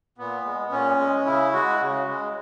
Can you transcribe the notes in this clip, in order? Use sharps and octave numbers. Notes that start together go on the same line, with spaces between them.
A#2 B3
G#3
A#2 C#4
G#3
C#3 E4
G#3 F#4
C#3
G#3